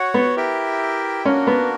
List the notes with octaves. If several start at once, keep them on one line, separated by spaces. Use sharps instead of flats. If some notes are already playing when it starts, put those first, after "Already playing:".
Already playing: F#4 C#5 F#5
B3
E4 G4 A#4 E5 G5
A#3 C#4 D4 F#4 A#4
B3